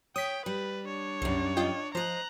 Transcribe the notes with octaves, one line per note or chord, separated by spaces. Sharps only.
C#5 G5 D#6 B6
G3 B4
D4 C#5
C2 F#2 G3
F4 D#5 G5
F3 C5 D#5 A#5 F#6